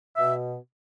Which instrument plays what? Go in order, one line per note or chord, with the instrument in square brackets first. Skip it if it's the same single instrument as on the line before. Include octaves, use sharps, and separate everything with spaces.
[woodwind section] B2 E5